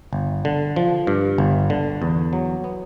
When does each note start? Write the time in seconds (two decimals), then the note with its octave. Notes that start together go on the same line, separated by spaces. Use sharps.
0.13 G1
0.45 D3
0.76 F3
1.07 G2
1.38 G1
1.70 D3
2.02 E2
2.33 F#3
2.64 B3